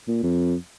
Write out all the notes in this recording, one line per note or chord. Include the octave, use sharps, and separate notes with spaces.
A#2
F2